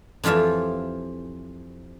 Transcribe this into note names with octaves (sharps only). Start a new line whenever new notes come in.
F2 E3 F4 G4 E5